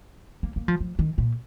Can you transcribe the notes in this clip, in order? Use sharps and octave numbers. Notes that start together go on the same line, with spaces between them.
A#3
A#3
F3
F3
D#3
A#2